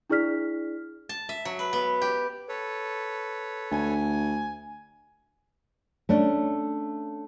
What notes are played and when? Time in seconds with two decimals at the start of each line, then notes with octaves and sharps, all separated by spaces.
0.10 D4 E4 G#4 D5 F6 B6
1.09 A5
1.29 E5
1.45 F#3
1.59 B4
1.73 B3
2.02 G4
2.49 A4 B4 C#5
3.71 D2 G#5
6.09 A3 C#4 D4